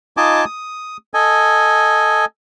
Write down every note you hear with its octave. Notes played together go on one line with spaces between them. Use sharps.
D#4 F4 D#5 G#5 A5 D6
D#6
A4 D#5 G#5